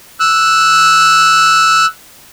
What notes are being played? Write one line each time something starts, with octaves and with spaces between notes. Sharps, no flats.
E6 F#6